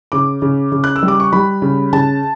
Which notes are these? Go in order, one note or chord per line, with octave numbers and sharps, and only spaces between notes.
C#3 D6
C#3
C#3
F#6
E6
G3
D6
C#6
G3 B5
C#3
C#3 A5